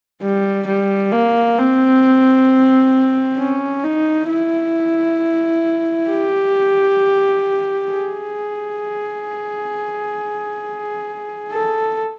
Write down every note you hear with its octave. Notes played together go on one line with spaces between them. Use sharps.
G3
G3
A#3
C4
C#4
D#4
E4
G4
G#4
A4